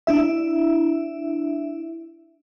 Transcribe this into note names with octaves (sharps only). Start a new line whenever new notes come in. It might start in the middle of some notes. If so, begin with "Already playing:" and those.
D4 E4 E5